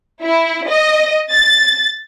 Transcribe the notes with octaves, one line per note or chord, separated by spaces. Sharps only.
E4
D#5
A6